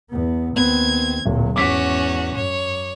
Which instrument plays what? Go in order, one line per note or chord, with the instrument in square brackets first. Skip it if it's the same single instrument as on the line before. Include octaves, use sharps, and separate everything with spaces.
[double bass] E2 B3
[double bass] D#2 C4 [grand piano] B3 [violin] G#6
[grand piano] D1 [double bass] A#2 F#3
[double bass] G#1 E2 [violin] C#4 F#4 [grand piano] D6 B6
[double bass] F#2 [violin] C#5